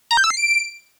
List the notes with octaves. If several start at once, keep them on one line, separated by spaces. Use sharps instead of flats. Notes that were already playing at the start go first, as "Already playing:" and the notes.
A#5
G6
E6
C7
D7